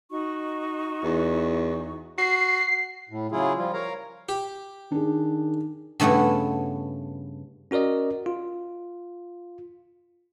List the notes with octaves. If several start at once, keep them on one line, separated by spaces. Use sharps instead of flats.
D#4 F#4 C#6
E2
F#4 C7
A2
C#3 F#3 E4 F4 G#4
F3 G3 F4
A#4 C#5 F5 A#5
G4
D#3 D4 G#4
G2 C#3 A3 B3 E4
C#4 F#4 A#4 D5 D#5
F4